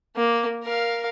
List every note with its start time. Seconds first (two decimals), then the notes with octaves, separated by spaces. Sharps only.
0.16 A#3
0.63 A#4 F5